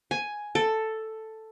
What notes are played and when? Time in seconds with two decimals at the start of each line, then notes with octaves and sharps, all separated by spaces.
0.11 G#5
0.55 A4